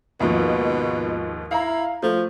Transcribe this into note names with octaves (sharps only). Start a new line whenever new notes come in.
D#2 G#2 B2 F3
E4 F5 A#5
F3 A3